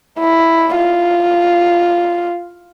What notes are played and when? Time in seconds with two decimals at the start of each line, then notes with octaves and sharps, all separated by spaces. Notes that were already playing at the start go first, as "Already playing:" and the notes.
0.19 E4
0.76 F4